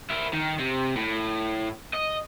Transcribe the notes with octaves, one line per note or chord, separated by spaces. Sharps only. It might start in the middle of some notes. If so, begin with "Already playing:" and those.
E4 A#4
D#3
C3
A2
D#5